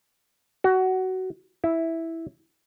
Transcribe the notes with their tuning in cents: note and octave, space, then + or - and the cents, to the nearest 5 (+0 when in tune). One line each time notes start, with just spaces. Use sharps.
F#4 +20
E4 -5